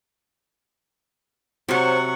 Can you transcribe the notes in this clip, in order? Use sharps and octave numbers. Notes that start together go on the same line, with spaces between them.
C3 F#3 A4 C5 C#5 F#5 C#6